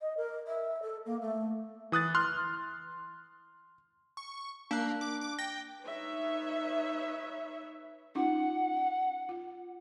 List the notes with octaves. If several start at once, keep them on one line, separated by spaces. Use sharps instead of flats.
D#5
A#4
E5
A4
A#3
A3
E3 D#6 F#6 A6
C6 F6 F#6
C#6
A#3 D4 F#6
D6
D6
G5 A#6
D#4 B4 C#5 E5
C#4 D#4 F4 F#5
F4